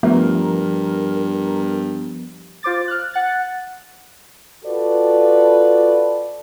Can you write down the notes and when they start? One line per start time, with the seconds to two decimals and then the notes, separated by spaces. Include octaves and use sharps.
0.03 G2 F3 A3 B3 A#4
2.63 F4 C5 D6 A6
2.88 F6 F#6
3.14 F#5 F#6 A6
4.65 F4 F#4 A4 B4 D5